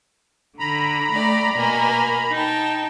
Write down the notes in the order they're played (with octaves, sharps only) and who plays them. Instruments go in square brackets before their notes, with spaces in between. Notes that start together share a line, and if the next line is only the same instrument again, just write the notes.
[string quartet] D3 [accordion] A#5 B5
[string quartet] A3 D5 G5
B2 A#3 G#5
D#4 G5 A5